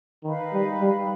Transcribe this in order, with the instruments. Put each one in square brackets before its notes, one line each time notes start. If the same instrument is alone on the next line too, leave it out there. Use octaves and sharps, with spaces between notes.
[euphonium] D#3 [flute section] D#4 B4 F5 B5
[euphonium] G3
G3